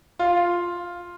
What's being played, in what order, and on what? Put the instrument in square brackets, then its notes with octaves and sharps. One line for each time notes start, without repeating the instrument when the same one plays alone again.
[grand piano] F4